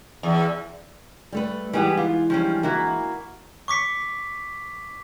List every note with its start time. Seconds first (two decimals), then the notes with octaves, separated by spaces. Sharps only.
0.23 E2
1.32 G3 A3 B4
1.73 E3 G3 G#3 B3 D#4 G4
1.97 F4
2.30 F3 G3 C#4
2.63 A#3 E4 F#4
3.68 C#6 D6 B6 C#7